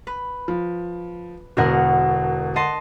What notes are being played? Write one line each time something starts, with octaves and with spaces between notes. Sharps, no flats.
B4
F3
E1 B2 D3 A#4 F#5
D#5 F#5 A5 C6